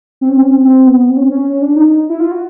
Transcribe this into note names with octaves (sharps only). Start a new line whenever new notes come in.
C4
C#4
C4
C#4
C4
C4
B3
C4
C#4
C4
C#4
C#4
D4
D#4
E4
F4
F#4